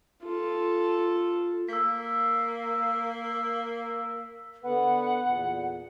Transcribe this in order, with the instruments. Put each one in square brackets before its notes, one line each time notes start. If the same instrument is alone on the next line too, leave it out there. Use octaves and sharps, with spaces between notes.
[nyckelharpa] F4 A4
[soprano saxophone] A#3 [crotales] E6 B6
[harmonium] D3 B3 B4 [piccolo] F#5
[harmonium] E2 A#2